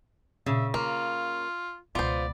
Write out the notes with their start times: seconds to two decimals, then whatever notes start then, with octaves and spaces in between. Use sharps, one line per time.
0.46 A#2 C#3 E5
0.74 A#3 C#4 F4
1.95 C#2 B2 B3 F4 C5 D5